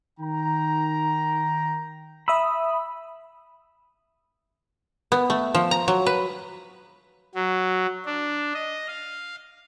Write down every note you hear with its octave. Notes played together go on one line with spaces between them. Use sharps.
D#3 G5 A#5
E5 B5 D#6 E6
B3
A3
F3
A#5
F#3
B4
F#3
D4
D#5
F5